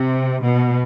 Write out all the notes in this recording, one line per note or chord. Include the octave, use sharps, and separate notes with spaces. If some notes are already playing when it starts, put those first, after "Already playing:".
Already playing: C3
B2